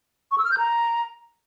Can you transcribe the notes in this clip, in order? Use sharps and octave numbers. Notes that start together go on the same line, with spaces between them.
C#6
E6
F6
G6
A#5